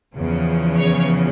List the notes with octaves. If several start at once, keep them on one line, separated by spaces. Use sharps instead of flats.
E2 C#3 F3
C#5